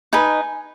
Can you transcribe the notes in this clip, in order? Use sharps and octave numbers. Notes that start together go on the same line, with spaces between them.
D#4 B4 D#5 G#5